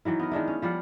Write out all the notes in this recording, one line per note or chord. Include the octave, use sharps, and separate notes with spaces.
D#3 E3 F#3 E4
B3 A#4
D#3 G#3 D4 E4
C#4
F3 G3 F4 F#5